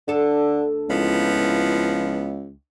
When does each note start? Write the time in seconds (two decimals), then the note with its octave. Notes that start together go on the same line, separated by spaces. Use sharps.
0.08 D2 D3 A4
0.89 C#2 F3 B3 E4